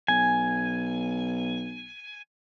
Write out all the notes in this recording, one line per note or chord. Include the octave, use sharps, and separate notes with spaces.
B1 G#5